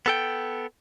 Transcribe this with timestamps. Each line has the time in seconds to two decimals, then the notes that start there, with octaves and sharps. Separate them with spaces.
0.06 B3 A4 G5